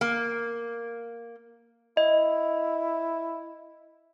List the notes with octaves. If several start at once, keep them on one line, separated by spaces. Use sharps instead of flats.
A#3
E4 D#5